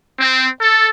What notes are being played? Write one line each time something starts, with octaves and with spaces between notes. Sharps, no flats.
C4
A4